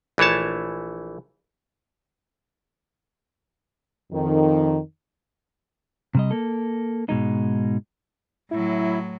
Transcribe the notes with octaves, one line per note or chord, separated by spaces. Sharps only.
A#1 E3 A3 C#5 A5
F2 D#3
C3 G3 D#5
A#3 A4
G#2 B2 G#3 D#4
A2 F#3 E4